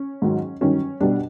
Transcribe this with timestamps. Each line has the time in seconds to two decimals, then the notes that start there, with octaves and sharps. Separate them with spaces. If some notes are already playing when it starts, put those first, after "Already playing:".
Already playing: C#4
0.22 G#2 D#3 F#3
0.61 G2 D#3 F#3 C#4
1.00 B2 G3 D4